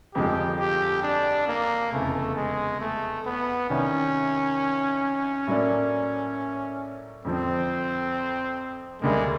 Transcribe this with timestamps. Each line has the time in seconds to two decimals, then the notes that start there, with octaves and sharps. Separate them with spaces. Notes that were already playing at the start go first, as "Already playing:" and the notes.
0.14 G1 F2 D3 F3 G#3 G4
0.59 G4
1.03 D4
1.48 A#3
1.92 F1 E2 C#3 A3
2.36 G#3
2.80 A3
3.26 B3
3.70 C2 C3 D#3 G3 C#4
5.47 A2 F#3 A#3 D4
7.25 F2 D3 F3 C4
9.02 D2 D3 G3 G#3 A#3